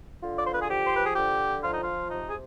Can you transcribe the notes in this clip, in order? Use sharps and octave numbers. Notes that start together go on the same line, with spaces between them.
D3 F4
D5
C5
B4
G#4
F3 G4
C5
B4
G#4
D3 G4
F3 F4
D#4
F4
C3 D#4
G#4